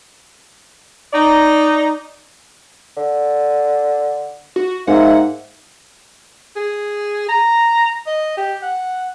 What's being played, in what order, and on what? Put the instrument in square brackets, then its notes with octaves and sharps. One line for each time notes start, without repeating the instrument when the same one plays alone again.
[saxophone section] D#4 D5
[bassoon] D3
[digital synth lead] F#4
[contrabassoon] G#2 [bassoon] A#3 [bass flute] E5 [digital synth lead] F#5
[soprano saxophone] G#4
A#5
D#5
G4
F#5